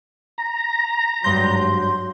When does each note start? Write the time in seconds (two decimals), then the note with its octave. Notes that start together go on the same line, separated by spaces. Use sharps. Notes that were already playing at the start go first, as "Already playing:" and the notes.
0.38 A#5
1.24 G#1 G2 F#3 C6 G6